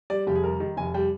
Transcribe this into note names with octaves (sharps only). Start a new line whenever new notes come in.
G3 D5
F1 G4
G#4
G3 A#4
D#3
F1 G#5
G3 G5